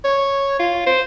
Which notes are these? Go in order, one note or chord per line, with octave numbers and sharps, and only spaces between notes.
C#5
F4
C5